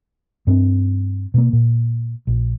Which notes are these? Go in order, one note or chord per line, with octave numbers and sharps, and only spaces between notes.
G2 C4 D4
B2 A#3
A#2
A#1